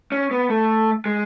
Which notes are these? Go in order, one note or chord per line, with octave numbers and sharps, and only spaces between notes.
C#4
B3
A3
G#3